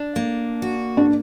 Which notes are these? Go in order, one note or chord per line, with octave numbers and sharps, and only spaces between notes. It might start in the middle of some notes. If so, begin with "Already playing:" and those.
Already playing: D4
A#3
F#4
D4